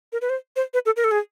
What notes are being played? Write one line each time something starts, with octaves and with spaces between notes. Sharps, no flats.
A#4
B4
C5
C5
B4
A4
A#4
A4
G#4